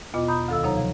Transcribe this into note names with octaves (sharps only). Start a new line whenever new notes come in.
E2 B2 B3 F4 D#5 D6
A#5 B5 D#6 G6
D2 D#3 A4 F5 E6
C3 F#3 D#4 C#5 A#5
F3